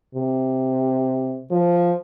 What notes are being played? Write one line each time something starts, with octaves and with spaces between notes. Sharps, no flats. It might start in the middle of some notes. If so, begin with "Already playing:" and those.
C3
F3